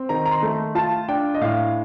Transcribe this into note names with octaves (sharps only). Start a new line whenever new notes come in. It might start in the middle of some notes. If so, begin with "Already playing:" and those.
Already playing: C4
D#3 A#5
A#5
C6
A3
F4 A5
D4 G5
D#5
A2 F5